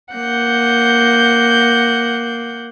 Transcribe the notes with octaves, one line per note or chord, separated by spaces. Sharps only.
A#3 F#5 G6